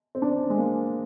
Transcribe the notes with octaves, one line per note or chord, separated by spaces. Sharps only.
C4
D4
G#3
A#3